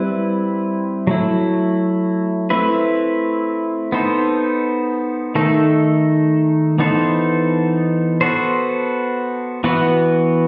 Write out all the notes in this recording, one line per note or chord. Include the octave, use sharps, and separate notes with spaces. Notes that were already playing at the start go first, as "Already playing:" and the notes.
Already playing: G3 C4 E4 B4
F#3 A3 E4
A3 C4 E4 B4
B3 D#4 A4 C5
D#3 A3 D#4 A4
E3 B3 D#4 A4 C5
B3 F#4 A4 C5
E3 B3 F#4 B4